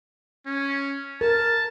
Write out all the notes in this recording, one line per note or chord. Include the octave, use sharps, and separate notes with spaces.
C#4
A#4 A5